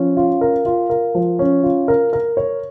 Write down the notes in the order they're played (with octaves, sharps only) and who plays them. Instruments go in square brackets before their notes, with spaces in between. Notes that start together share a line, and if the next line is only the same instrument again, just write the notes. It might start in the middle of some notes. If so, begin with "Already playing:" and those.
Already playing: [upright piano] F3 C#4
F4
A#4
F4
A#4
F3
C#4
F4
A#4
A#4
C#5